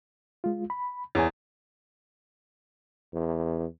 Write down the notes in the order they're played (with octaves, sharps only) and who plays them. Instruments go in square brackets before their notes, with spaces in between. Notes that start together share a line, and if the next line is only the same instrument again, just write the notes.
[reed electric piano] G#3 F4
B5
[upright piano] E2 [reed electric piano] C#5 G#5
[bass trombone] E2